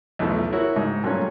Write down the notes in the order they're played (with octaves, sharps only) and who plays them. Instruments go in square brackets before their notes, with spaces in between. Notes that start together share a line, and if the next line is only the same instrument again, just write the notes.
[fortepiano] B1 E2 B2 F3 A3
E4 F#4 A#4 C#5
D#2 G#2
G2 A#2 F#3 A3 C#4